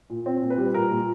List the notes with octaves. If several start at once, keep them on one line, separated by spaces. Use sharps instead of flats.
A#2
C4
A#2
B4
G3
A#2 A#4
A#2